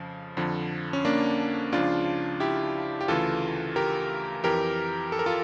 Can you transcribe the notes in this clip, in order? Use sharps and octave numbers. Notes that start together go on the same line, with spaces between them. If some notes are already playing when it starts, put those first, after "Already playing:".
Already playing: F2 C#3 F3
F2 D3 F3
C#4
A#3 D4
C#2 C#3 F3 D4 F4
E4 G4
G4
D2 C#3 E3 F4 A4
G4 A#4
F2 E3 G4 A#4
A4
A#4
F4 A4